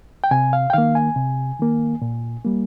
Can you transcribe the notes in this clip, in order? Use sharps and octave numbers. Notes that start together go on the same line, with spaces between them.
G5
C3 G#5
F5
G5
D#3 A#3 F5
G#5
C3
D#3 A#3
A#2
G3 A#3